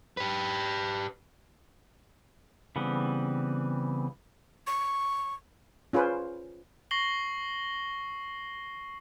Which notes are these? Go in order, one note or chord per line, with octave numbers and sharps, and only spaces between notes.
G4 B4
C#3 E3 G3 B3 C4
C#6
C#4 F4 G#4 B4 C5
C#6 A#6 C7 F#7 G7